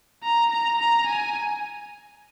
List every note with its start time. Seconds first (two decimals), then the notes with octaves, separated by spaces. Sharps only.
0.23 A#5
0.50 A#5
0.79 A#5
1.07 G#5